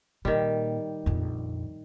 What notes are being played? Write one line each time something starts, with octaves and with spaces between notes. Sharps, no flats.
A#2 D#3 G3
A#1 F2